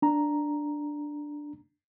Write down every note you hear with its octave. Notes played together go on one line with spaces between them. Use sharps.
D4 A#5